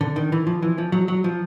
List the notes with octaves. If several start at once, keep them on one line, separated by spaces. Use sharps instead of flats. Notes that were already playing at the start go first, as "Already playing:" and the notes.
D3
D#3
E3
F3
E3
F3
F#3
F#3
F3